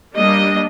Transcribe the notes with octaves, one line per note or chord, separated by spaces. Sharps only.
G3 A#3 D4 D#5